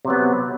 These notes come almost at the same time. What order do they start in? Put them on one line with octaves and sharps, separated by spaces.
C3 F#3 B3